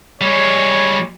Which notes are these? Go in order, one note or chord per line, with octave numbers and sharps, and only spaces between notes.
G3 G#3 C#5